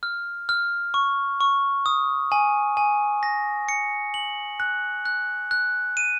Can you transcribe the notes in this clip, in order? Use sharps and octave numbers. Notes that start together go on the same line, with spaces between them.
F6
F6
C#6
C#6
D#6
G#5
G#5
A#6
C#7
F#7
F#6
F#6
F#6
D#7